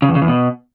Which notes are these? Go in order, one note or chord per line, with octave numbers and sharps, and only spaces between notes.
C#3
E2
C#3
E2
B2